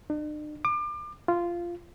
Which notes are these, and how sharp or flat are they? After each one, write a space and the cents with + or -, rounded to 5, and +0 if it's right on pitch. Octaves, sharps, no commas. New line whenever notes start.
D4 +45
D6 +35
F4 -10